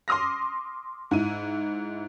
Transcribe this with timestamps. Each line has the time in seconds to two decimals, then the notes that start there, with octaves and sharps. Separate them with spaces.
0.08 C6 D6 D#6 F6 A#6
1.11 G#2 E4 D#7